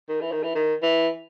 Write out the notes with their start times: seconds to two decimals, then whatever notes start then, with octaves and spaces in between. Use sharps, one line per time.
0.09 D#3
0.21 E3
0.32 D#3
0.44 E3
0.55 D#3
0.82 E3